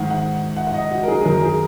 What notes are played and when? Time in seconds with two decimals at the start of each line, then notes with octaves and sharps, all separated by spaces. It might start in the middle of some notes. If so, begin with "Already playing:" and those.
Already playing: G#2 D#3 F#5
0.10 F#5
0.56 F#5
0.67 F#5
0.74 D#5
0.91 F#4
1.03 A#4
1.08 G#4
1.21 G#4
1.25 F#2 D#3 A#4
1.42 G#4